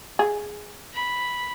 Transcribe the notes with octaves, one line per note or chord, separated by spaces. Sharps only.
G#4
B5